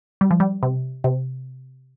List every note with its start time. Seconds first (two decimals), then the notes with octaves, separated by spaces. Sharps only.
0.21 G3
0.31 F3
0.40 G3
0.63 C3
1.04 C3